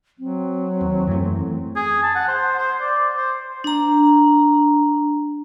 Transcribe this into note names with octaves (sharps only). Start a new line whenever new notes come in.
F#3 C4
D#2
F#2 E3 A3
G#4
A5
F#5
C5
C5
D5
C5
D4 A#5